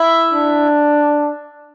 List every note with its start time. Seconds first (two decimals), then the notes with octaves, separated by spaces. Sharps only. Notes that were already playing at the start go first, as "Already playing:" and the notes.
Already playing: E4 E5
0.34 D4